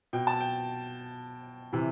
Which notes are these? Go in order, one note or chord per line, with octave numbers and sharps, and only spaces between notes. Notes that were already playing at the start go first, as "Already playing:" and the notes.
B2 G5
A5
G5
C3 E3